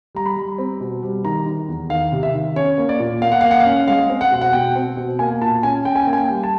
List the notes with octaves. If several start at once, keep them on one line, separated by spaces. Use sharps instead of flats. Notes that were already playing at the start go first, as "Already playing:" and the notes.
G3 A#5
B5
G3
C4
B2
G3
D#3 A#5
D#3
E2
D#3 F5
C3
E5
D#3
C#4 C#5
A#3
D5
A#2
A#3 F5
F#5
A#3 F5
F#5
F5
C#4
G#3 F5
C4
F#5
B2
F#5
B2 G5
C4
B2
A#3 G#5
A#2 A5
C#4 G#5
C#4 G5
G#5
A#3 G5
G#5
G5
G3
A5